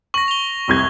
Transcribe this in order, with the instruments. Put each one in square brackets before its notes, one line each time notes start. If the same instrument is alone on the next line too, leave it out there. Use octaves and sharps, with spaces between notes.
[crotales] C#6 A#6 [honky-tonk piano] F#7
[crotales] F7 G7
[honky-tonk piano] F1 C2 G#6